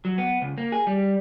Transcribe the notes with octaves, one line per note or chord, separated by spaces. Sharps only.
F#3
B3
C#2
A#3
G#4
G3